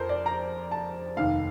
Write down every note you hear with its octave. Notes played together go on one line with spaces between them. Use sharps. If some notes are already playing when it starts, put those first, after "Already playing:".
Already playing: F2 A#4 C5
D5
A#5
A5
F1 D#2 D#3 F5